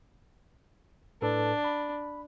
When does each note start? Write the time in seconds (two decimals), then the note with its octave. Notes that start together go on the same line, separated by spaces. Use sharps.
1.22 A2 D4 A4 B4
1.64 B5